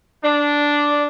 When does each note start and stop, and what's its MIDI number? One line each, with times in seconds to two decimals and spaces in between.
0.23 1.07 62